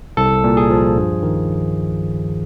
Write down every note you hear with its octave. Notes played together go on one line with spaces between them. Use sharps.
C2 A4
A#2
G#4
F3
G2
D#3